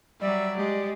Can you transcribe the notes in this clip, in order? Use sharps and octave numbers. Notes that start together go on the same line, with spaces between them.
F#3 G3 D5 E5
G#3 G4